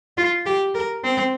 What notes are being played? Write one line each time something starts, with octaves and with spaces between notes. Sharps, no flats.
F4
G4
A#4
C4